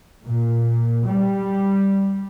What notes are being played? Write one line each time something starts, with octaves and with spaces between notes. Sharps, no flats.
A#2
G3